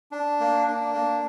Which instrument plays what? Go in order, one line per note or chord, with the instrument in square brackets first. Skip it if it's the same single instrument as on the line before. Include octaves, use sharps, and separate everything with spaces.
[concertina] D4
A#3
D4
A#3